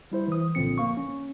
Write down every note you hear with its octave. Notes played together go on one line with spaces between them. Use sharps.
G3 E4 C5
E3 D#6
C2 A#2 D3 F3 C4 C#7
G1 A#3 F5 C#6
C#4